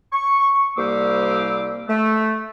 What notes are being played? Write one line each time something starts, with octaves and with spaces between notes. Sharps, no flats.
C#6
C2 G3 A#3 C5 D6 E6
A3